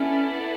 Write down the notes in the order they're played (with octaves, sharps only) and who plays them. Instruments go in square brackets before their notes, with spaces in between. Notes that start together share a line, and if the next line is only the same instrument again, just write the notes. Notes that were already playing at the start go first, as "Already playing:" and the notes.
Already playing: [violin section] B3 E4 A4 D5 [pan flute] C#4